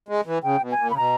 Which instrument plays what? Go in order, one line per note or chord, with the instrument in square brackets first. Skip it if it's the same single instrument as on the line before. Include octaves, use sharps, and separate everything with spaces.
[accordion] G#3
E3
[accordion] C#3 [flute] G5
[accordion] B2
[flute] G#5
[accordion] A#2
[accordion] C#3 [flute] B5
[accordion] B2 [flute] A#5